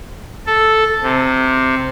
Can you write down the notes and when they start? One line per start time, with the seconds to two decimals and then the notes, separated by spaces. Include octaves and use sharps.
0.47 A4
1.02 C3